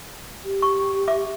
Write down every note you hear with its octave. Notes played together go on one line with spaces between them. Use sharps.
G4
C#6
E5 D6